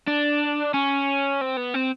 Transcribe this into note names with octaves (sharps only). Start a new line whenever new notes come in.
D4
C#4
C4
B3
C4